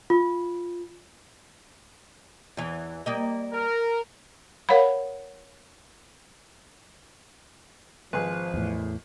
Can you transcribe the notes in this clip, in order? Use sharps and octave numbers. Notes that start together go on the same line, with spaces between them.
F4
E2 E3
G3 A#3 D#5
A#4
A#4 C#5 F5 F#5 B5
G#1 F3 G#4 B4
E2 A2